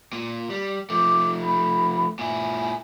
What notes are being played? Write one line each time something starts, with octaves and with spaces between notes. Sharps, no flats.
A#2
G3
F3 A3 D6
B5
A#2 E4 G#5